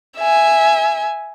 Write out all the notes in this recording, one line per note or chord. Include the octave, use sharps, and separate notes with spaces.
E5 G#5